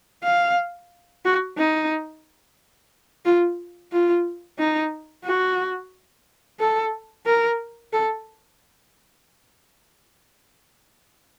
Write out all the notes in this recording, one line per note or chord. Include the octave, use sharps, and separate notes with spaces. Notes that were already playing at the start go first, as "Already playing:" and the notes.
F5
F#4
D#4
F4
F4
D#4
F#4
A4
A#4
A4